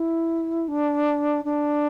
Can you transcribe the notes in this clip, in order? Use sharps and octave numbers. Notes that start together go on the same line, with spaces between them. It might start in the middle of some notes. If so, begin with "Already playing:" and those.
Already playing: E4
D4
D4